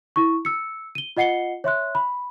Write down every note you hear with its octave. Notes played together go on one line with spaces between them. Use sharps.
E4 C#6
E6 C#7
D#7 G7
F4 D#5 F#5 C7 C#7 G7
C#5 E5 C6 F#6
B5